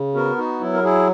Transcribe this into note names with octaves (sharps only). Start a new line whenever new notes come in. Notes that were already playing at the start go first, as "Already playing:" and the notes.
Already playing: C#3
B3 F#4 A#4
D#4 F#4
F#3 E4
A#4
E4 G#4